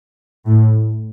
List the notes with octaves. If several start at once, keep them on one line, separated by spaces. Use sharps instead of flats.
A2